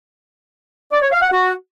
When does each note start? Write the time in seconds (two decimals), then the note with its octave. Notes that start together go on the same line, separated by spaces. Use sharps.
0.93 D5
1.02 C#5
1.12 F5
1.22 F#5
1.32 F#4